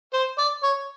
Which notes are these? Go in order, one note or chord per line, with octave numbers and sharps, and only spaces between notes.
C5
D5
C#5